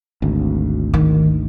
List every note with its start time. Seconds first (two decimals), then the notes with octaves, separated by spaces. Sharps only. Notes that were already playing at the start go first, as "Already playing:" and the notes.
0.22 G#1 D2
0.94 D#3